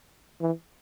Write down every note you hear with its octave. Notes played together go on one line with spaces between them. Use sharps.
E3